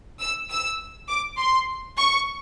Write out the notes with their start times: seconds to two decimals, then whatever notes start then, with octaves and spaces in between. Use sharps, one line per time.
0.20 E6
0.50 E6
1.09 D6
1.38 C6
1.98 C#6